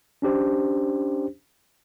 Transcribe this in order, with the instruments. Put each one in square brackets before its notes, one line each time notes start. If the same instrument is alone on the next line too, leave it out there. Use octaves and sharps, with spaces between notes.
[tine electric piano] C#4 D4 G4 C5